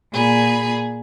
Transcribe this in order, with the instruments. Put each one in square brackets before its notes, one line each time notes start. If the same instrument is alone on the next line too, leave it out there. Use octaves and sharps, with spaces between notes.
[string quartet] A#2 G#4 B5